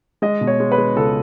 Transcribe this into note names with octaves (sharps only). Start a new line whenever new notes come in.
G#3 D#5
B2
C#5
G#3
B4
G#3
C#2 A4